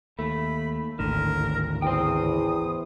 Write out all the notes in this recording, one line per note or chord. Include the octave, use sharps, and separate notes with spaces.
D#2 A3 B5
G#1 D2 A2 D3 A#4
E2 C5 G5 D#6